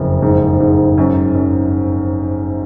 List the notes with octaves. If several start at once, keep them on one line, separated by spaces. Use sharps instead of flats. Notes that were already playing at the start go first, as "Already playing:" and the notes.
Already playing: F#1 F2
G#2
G#2
F#2
F#2